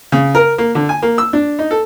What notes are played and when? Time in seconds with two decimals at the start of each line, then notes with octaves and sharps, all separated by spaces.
0.12 C#3
0.35 A#4
0.58 A#3
0.75 D3
0.89 G#5
1.02 A#3
1.18 E6
1.33 D4
1.59 D#4
1.71 A4